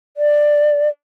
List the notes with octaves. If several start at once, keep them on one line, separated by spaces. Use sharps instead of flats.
D5